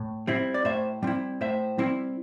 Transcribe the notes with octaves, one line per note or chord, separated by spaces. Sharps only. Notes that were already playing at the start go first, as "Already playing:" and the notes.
Already playing: A2
G3 C4 E4
D5
A2 C5 E5
G3 C4 E4
A2 C5 E5
G3 C4 E4